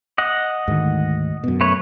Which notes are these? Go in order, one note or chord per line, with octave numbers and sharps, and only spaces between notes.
D#5 F#5
D2 G#2 D#3
F#2 B2
A3 B4 C#5